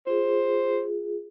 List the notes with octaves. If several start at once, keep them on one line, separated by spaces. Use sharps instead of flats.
F4 G#4 C5